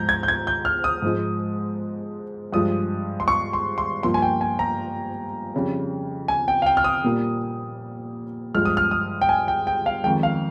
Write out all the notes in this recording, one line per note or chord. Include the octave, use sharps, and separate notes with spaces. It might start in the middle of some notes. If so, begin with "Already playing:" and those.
Already playing: G#2 F3 G#3 A#5 G6
G#6
G6
G#6
G6
F6
D#6
G#2 F3 G#3
G2 F3 G#3 D#6
C6
C#6
C6
C6
G2 F3 A#3 C6
G#5
G5
G#5
A#5
F2 C#3 G3
G#5
G5
F5
G5
F6
D#6
A#2 G3 A#3
G2 F3 G#3 F6
D#6
F6
D#6
G5
G#5
G5
G5
F5
F2 D#3 G#3 G5
F5